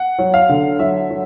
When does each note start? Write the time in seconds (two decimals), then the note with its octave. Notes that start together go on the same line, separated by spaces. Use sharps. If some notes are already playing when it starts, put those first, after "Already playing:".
Already playing: F#5
0.19 F#3
0.34 F5
0.49 D3
0.79 F#3 E5
1.10 F#3